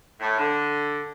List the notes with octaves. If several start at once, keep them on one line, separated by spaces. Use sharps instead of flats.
A2
D3